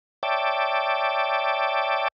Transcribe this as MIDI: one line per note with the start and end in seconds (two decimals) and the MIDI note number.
0.23 2.08 73
0.23 2.08 74
0.23 2.08 76
0.23 2.08 79
0.23 2.08 81
0.23 2.08 86